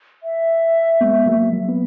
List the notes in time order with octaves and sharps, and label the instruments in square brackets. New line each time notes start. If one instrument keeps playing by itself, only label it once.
[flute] E5
[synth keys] G#3 B3
F#3 A#3
F#3
B3